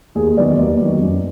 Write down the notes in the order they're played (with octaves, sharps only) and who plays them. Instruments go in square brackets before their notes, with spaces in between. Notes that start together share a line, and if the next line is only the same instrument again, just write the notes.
[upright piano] D#2 G#4
D#3 F#3 B3 D5
D#2
D#3 F#3 B3
F#2